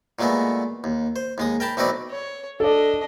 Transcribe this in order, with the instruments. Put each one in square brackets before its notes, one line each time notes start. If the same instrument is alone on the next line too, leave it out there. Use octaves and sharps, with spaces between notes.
[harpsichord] A#2 F#3 G#3 A3 B3
D#2
C5
D#2 G#3 D#6
A#4 G5 A5 B5
B1 A3 C4 D#4 B4 D5
[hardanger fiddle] C#5
[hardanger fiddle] D4 D#5 [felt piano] A4 D5